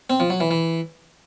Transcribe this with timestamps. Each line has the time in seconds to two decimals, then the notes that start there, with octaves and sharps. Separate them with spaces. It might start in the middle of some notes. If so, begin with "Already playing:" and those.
0.10 C4
0.20 F3
0.30 F#3
0.40 E3
0.51 E3